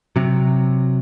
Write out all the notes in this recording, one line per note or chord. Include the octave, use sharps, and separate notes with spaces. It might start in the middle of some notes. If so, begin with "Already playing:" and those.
C3 F#3